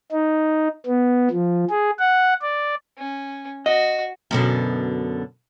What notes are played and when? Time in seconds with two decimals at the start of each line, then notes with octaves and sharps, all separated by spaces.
0.12 D#4
0.86 B3
1.31 F3
1.70 G#4
1.99 F#5
2.42 D5
2.97 C#4
3.66 F#4 D#5
4.31 F#2 B2 D3